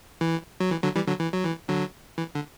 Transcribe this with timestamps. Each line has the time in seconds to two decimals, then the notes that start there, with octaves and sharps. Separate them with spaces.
0.21 E3
0.60 F#3
0.71 E3
0.83 D3 F#3
0.95 E3 G3
1.07 D3 F#3
1.20 E3
1.33 F#3
1.45 E3
1.68 D3 F#3
2.18 E3
2.35 D3